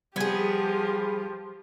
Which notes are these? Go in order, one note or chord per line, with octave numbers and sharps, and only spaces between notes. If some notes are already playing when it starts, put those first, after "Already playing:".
F3 G3 B3 G4 G#4 G#6